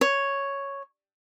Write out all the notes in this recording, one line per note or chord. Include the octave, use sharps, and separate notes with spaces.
C#5